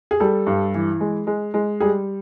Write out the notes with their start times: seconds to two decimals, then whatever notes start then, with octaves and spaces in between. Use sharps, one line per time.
0.11 G#4
0.20 G3 A4
0.47 G2
0.75 E3
1.01 G#3
1.27 G#3
1.54 G#3
1.80 G3 G#4